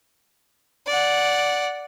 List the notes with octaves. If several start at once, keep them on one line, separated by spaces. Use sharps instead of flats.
D5 F#5